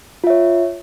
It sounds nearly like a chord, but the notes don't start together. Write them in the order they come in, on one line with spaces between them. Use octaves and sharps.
F4 E5 C#5